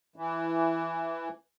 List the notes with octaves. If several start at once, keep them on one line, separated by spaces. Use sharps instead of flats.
E3